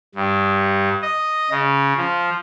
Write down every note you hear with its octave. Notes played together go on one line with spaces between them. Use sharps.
G2
D#5
C#3
F3